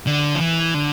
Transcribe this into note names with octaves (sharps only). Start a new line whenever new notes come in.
D3
F3
E3
D3